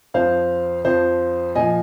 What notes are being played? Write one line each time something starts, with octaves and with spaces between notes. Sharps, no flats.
F2 F3 C5 F5
F2 F3 C5
A#2 F3 D#5 G#5